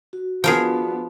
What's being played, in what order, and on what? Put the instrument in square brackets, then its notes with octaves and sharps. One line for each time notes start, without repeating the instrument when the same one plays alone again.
[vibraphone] F#4
[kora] F3 [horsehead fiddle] B3 D4 [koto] G#4 A#4 G5